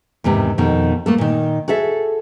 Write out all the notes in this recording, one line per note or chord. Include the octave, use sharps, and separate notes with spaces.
E2 G#2 C3 D#3
F2 B2 D#3
A3 A#3 A4
A#2 D#3
F#4 G#4 A4 E5